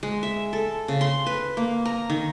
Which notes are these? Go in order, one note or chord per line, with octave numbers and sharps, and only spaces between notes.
G#3
E5
A4
C#3
C6
B4
A#3
A#5
D#3